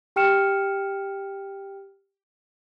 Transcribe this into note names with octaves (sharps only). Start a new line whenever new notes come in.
G4 G5 F6 C#7 E7